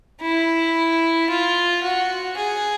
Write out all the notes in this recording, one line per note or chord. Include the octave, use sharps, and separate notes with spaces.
E4
F4
F#4
G#4